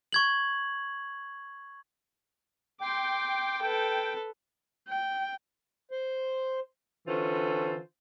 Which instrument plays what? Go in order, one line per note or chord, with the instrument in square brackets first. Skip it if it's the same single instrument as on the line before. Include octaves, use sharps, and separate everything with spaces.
[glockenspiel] C#6 G#6 F#7
[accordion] G5 [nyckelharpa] C6 D6
[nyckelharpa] A4 B4
[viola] G5
[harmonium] C5
[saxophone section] D3 E3 C#4 F4 C5